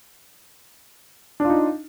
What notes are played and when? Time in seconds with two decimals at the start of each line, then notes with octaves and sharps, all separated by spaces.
1.40 D4
1.45 F4
1.50 D#4